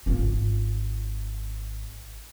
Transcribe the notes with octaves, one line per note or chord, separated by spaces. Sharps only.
G#1 F4